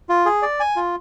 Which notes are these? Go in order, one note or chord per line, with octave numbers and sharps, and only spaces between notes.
F4
G#4
D5
G#5
F4